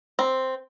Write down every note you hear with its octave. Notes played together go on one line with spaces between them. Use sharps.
C4